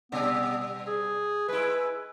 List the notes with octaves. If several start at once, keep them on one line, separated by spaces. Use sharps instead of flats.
B2 G3 B3 D4
G#4
G#3 E4 B4